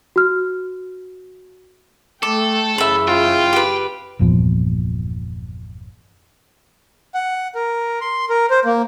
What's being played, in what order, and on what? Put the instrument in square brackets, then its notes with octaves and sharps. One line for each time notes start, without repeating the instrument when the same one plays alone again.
[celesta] F#4 F6
[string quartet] A3 G5 [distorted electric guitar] A4 [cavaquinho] D6
[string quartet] F#2 C#3 E3 [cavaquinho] E5 B5
[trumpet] F4 [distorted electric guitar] G5
[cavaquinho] G4 B4
[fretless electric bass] G1 E2 A#2 F3
[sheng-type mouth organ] F#5
A#4
C6
A#4
C5
A#3